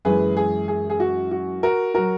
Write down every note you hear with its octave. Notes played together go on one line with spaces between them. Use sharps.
F#2 E3 G#3 G#4 B4
G#4
G#4
G#4
F#4
F#4
F#4 A#4
F#3 F#4 A#4